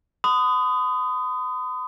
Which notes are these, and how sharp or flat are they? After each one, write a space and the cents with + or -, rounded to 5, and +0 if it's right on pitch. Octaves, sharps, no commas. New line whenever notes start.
B5 +45 D#6 -5